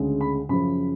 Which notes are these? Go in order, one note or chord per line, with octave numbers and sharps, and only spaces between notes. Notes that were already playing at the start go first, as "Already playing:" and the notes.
Already playing: D2 C#3 G#3
B5
F#2 C#3 F3 B5